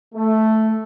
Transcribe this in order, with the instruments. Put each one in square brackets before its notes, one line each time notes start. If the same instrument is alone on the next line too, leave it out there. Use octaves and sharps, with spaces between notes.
[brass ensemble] A3